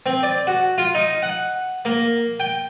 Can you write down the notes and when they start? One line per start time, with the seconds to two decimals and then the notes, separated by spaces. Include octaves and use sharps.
0.06 C4
0.23 D5
0.47 F#4
0.78 F4
0.95 D#4
1.23 F#5
1.85 A#3
2.40 G5